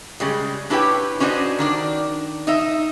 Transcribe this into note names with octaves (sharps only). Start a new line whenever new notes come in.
C#3 G3 G#3
D4 E4 G4 B4 C#5 G5
C#4 D4 F#4 C5 D#5
D#3 D4 D5
D#4 D#5 E5